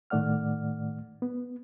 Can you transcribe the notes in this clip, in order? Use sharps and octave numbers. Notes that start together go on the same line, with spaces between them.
A2 D#3 A3 D5 F#5 F6
B3